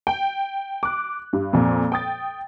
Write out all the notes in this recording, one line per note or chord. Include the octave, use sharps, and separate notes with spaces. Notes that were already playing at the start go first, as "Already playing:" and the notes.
G5
D6 F#6
G2
F2 A#2
G5 D#6 A6